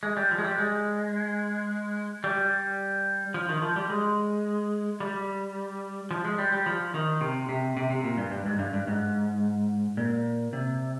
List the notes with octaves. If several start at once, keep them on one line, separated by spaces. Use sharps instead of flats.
G#3
G3
F3
G#3
G3
G#3
G3
F3
D#3
F3
G3
G#3
G3
F3
G#3
G3
G3
F3
D#3
C3
C3
C3
C3
A#2
G2
G2
G#2
G2
G2
G#2
A#2
C3